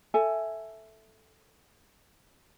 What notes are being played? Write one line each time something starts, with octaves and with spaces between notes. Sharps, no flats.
A4 E5 G#5